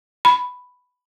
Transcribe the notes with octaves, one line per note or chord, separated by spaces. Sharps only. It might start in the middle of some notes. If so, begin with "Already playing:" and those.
B5